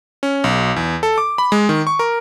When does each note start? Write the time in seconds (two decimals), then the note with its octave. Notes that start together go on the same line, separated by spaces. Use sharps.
0.23 C#4
0.44 B1
0.76 E2
1.03 A4
1.18 D6
1.38 B5
1.52 G#3
1.69 D#3
1.87 C#6
1.99 A#4